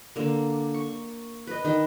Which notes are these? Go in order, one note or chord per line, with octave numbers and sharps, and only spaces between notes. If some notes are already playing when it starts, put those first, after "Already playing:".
D3 A#3
C#6
B4 D#5
D#3 D#5